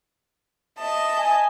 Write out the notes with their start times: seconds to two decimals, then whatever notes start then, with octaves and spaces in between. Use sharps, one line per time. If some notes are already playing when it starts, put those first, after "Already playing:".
0.79 D#5 E5 A5
1.18 G#5